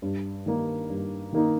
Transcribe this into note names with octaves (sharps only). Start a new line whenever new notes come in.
G2
D#3 A#3 D#4
G2
D#3 A#3 D#4